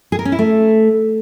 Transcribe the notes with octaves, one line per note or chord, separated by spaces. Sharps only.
G#4
A#4
C#4
E4
A3